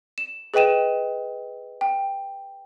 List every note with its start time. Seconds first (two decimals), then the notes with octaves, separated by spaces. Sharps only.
0.18 E7
0.54 G#4 B4 D#5 G5 D#7 E7
1.81 G5